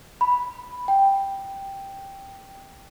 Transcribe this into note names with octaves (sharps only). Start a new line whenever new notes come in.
B5
G5